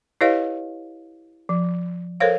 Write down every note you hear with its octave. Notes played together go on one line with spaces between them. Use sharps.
E4 G4 B4 C#5 D#5 F5
F3
A4 A#4 C5 C#5 F5